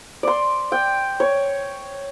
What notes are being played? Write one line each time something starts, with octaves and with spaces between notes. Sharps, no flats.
D5 C6
G5
C#5